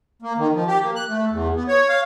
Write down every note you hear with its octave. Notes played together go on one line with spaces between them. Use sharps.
A#3
D#3
F3
G4
A#3
F#6
A3
E2
B3
C#5
F5